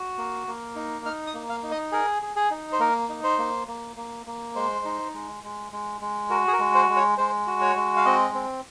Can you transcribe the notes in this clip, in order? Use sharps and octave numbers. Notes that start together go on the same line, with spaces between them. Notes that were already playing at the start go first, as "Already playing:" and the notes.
Already playing: F#4
A#3
A#3
D#4
D#4 F6
D#6
A#3
F5
D#4
D#5
G#4 A#4
G#4
G#4
D#4
C5
A#3 A#4
D#4
C5
A#3
A#3
A#3
A#3
G#3 C5
D#4
G#3
G#3
G#3
G#3
F#4 A#4
G#4
A#4
G#3
C5
G#3
C#5
G#3 C5
F#4
C#5
G#3
F5
C4 D#5
C4